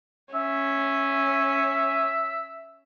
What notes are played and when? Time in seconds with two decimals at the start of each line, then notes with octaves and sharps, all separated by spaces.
0.34 C#4 E5